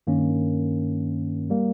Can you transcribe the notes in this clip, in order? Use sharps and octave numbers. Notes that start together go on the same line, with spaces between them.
G2 D#3 A#3 C#4
G3 A#3